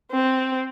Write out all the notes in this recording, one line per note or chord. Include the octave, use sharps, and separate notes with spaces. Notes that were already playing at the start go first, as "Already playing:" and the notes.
C4